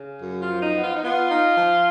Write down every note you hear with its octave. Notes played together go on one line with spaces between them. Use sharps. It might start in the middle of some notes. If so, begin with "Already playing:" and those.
Already playing: C#3
F#2
F4
F3
D#4
B3
F4
D#4
B3 F4
D#4
F3